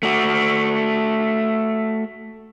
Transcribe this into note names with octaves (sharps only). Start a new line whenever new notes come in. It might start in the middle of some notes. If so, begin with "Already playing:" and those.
A3 F#4